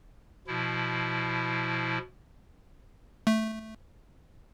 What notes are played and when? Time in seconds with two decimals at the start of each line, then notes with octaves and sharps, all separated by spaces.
0.47 B2 F3 E4
3.27 A3